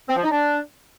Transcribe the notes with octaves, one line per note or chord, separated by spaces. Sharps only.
C4
F3
D#4
D4